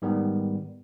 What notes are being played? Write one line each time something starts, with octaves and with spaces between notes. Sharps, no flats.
G#2 D#3 G3 B3